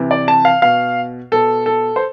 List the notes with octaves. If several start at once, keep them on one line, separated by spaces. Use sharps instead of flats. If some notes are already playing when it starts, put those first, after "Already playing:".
Already playing: C3 E3
D5
A5
F5
B2 F5
B2 A4
A4
C5